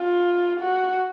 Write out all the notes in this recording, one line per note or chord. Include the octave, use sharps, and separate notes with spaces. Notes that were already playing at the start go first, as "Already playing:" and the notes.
Already playing: F4
F#4